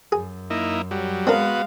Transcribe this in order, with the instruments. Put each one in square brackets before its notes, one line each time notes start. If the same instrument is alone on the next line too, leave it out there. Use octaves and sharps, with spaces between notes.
[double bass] F#2 [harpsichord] G#4
[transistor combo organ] A#3 D#4 E4
F#3 G3
[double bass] G#3 [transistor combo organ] B3 F#4 [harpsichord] C4 D4 A#4 [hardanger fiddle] F5